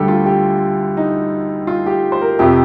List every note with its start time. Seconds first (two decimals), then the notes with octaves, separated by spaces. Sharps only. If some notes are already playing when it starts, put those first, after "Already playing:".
Already playing: D2 D3 G3 G4 A4
0.08 F4
0.26 G4
0.97 D#4
1.67 F4
1.86 G4
2.12 C5
2.21 A#4
2.39 F2 C3 F3 G4